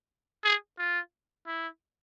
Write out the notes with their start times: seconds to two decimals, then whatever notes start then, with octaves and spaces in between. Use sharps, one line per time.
0.44 G#4
0.79 F4
1.47 E4